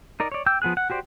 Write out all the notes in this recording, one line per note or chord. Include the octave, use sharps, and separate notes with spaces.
D#4 A#4 D5
C#5 D5
G5 D6 E6 G6
F3 B3 G#4 F#6
F#5
F#4 G4 C5 D5